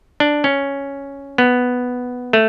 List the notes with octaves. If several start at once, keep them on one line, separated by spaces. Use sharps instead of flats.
D4
C#4
B3
A3